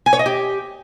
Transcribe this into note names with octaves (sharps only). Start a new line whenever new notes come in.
G#5
C#5
D#5
G4